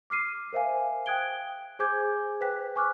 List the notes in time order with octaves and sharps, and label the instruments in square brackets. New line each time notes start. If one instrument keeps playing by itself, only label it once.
[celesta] D6 F6 C7 D#7
A#4 C5 E5 F5 G#5
G5 D#6 F#6 G#6 D7 G7
G#4 C5 G#5 D6 G6 G#6
B4 C5 G5 F#6 B6
G#5 C#6 D6 F6 F#6